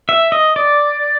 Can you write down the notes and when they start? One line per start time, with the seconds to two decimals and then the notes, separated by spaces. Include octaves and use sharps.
0.09 E5
0.32 D#5
0.56 D5